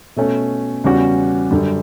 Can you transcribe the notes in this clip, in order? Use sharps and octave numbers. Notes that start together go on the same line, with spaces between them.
B2 A3 C#4
E2 C#3 G3 C#4 F#4
F#2 D3 G3